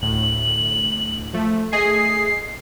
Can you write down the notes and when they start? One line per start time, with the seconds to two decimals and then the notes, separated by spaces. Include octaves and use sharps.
0.02 D2 A2 F#7
1.33 F3 A3
1.72 A3 G#4 D#5 C7